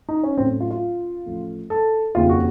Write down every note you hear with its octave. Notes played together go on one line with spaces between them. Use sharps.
D#4
C#4
A1 A2 F#3 A3 C4
F4
F4
A1 A2 F3 A3
A4
F1 D#2 C#3 F4
F#4